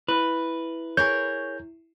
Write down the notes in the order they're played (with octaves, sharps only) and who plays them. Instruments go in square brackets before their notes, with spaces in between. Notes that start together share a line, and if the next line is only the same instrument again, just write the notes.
[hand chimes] E4 [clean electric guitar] B4
[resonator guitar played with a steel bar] G#4 A#4 C#5 [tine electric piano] G6